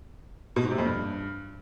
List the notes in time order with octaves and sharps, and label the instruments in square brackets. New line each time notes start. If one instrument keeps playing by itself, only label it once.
[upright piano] B2
G#2
C3
F2
G2